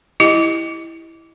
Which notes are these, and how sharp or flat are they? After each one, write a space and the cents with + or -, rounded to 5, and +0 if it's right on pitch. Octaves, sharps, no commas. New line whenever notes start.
E4 +0 G4 +0 D#5 +0